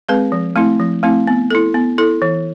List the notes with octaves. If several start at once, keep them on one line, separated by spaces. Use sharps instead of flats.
G#3 C4 G#4 B4
F3
A3 C4 E4
F3
A3 C4 E4
B3
E4 A4
B3
E4 A4
E3